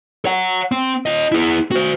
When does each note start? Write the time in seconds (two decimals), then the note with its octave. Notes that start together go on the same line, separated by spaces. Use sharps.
0.25 C#5 F#5
0.72 C4
1.06 F4 D#5
1.32 E4 G#4
1.72 F#4 C5